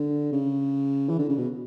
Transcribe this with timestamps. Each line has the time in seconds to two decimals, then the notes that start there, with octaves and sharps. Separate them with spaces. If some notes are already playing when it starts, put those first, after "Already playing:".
Already playing: D3
0.32 C#3
1.09 E3
1.19 D3
1.29 C#3
1.38 B2